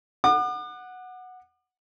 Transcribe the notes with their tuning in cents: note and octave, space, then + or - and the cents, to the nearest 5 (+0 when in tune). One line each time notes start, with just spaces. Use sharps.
F#5 -5 D6 +45